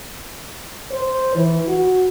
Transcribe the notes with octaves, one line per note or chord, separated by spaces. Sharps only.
C5
E3
F#4